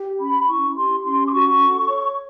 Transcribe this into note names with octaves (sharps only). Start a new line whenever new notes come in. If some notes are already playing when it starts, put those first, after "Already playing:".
Already playing: G4
C#4 B5
E4 C#6
G4 C6
C#4 C6
D6
F#4 C#6
A4
C#5